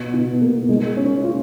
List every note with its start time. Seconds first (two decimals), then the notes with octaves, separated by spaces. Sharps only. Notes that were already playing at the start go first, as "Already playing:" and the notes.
Already playing: B2
0.14 B2
0.41 A#3
0.69 G#3
0.97 C#4
1.24 F4